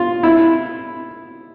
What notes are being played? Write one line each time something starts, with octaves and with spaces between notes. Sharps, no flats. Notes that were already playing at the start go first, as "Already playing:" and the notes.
Already playing: F4
E4